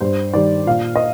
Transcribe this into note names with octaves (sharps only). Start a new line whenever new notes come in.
G2 C5
D#3 G3 D5
A#2 F5
D#5